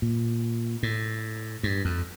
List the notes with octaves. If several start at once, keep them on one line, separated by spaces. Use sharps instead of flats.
A#2
A2
G2
F2